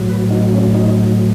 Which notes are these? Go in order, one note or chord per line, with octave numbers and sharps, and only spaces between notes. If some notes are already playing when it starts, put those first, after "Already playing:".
Already playing: A2 F#3
B4
D#4
C#4
D#4